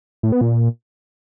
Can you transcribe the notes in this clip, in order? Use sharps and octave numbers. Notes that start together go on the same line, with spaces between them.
A2
B3
A#2